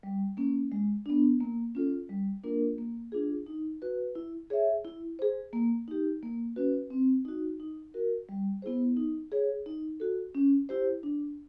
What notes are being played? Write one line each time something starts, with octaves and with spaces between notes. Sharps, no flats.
G3
A#3 C#4
G#3
B3 D4
A#3
C#4 F4 A4
G3
A#3 D4 F4 A#4
A#3
D4 F4 G#4
D#4
F#4 B4
E4
G#4 C#5 E5
E4
G#4 C5
A#3
D#4 G4
A#3
C#4 F#4 B4
C4
D#4 F#4
D#4
F#4 A#4
G3
B3 E4 G#4 C5
D#4
G#4 C#5
D#4
F#4 A4
C#4
E4 G4 C5
D4